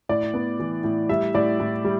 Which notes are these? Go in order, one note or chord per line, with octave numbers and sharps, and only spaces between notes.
A2 D5
B3
E3
A2
G3 E5
A2 D5
A2
G3